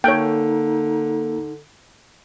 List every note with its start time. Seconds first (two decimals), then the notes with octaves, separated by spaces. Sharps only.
0.04 D3 A#3 D#4 A4 C#5 G5